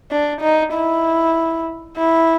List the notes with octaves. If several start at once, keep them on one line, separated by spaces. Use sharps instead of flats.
D4
D#4
E4
E4